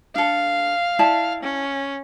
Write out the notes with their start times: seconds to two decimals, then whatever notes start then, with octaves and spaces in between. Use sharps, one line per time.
0.15 D4 A4 F5
0.99 E4 D5 A5
1.43 C#4